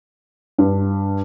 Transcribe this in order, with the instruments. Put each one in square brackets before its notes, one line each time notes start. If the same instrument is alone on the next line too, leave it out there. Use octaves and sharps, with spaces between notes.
[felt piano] G2